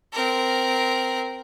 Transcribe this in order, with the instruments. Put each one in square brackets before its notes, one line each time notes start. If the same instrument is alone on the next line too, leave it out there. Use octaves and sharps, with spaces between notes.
[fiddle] C4 A#4